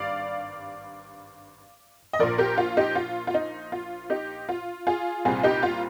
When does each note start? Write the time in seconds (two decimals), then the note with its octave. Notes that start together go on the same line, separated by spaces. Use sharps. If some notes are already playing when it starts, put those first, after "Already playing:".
Already playing: G#1 G2 G3 D5 F5
2.13 D#5
2.19 A#1 A#2 F3 A#4 D5
2.38 G4 A#4
2.58 F4
2.77 D#4 G4
2.95 F4
3.27 F4
3.34 D#4
3.72 F4
4.10 D#4 G4
4.49 F4
4.87 F4 G#4
5.25 C2 A#2 G3 C4 F4 G#4
5.43 D#4 G4
5.63 F4